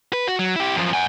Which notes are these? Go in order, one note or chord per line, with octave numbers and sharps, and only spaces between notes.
B4
F#4
F#3
E4 G4
F#2 F3
F#5 G#5